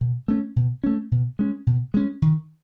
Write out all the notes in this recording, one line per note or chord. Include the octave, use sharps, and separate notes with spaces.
B2
A3 C#4
B2
A3 C#4
B2
G#3 C#4
B2
G#3 C#4
D#3